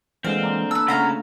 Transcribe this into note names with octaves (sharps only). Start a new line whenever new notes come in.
A#2 D3 E3 G#3 C4 F5
D5 G#5 A#5
B4 A5 E6
C#3 A3 F4 F5 F#5 A#5 B5